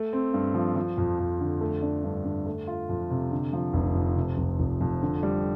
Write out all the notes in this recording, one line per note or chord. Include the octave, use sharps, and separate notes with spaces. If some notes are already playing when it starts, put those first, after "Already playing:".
Already playing: A3
C4
G2
F3
F3
F2
F2
D3
A3
D4
G2
D3
A3
F4
F2
C3
D3
F3
F1
F2
C3
F1
F1
F2
D3
G3